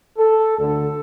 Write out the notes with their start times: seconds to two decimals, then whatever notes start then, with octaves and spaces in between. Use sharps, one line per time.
0.18 A4
0.58 D2 D3 A4